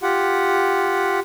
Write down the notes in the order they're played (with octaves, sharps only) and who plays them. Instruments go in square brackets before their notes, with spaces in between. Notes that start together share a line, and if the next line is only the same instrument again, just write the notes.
[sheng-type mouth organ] F4 G4 F#5